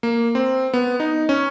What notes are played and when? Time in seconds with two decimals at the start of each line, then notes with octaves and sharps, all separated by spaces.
0.03 A#3
0.35 C4
0.73 B3
1.00 D#4
1.29 C#4